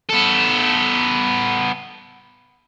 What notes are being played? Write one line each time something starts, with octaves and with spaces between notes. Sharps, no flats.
B3 A4